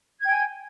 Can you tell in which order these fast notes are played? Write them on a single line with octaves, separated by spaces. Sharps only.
G#6 G5 G#5